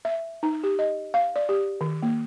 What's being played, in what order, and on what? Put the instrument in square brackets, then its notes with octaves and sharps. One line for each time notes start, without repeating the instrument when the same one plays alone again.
[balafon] E5
D#4
G4
D#5
F5
D5
G4
D#3
A#3